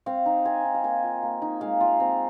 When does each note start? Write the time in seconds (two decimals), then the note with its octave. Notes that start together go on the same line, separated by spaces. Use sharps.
0.06 C4 F5
0.26 D#4
0.45 C4 G#5
0.65 D#4
0.74 F5
0.84 A#3 G#5
1.04 F4
1.23 A#3
1.42 D#4
1.61 G#3 F5
1.81 F4
2.00 C4